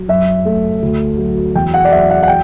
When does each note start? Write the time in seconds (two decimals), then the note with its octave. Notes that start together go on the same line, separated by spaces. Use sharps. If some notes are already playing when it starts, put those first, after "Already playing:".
Already playing: F#3
0.08 F#2 E5
0.45 A3
0.82 D2
1.18 F#3
1.55 E2 G5
1.74 F#5
1.85 D5
1.91 F#3 E5
2.10 F#5
2.23 F#5
2.28 G5